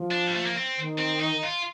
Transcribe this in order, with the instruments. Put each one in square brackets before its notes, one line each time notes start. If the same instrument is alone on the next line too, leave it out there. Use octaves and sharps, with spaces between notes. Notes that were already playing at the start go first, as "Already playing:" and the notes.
Already playing: [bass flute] F3
[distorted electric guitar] D4
G3
A3
A#3
C4
[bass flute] D#3
[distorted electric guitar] C4
D#4
F4